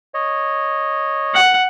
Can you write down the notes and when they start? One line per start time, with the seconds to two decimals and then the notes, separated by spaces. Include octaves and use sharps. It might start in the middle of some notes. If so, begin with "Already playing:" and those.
0.14 C#5 D#5
1.34 F#5